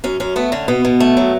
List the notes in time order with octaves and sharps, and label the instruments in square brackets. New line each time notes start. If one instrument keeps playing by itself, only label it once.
[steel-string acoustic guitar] F#2 C#4
F#2 C#4
A3 B3
D3 C#4
B2 B3
B2
A3
F#3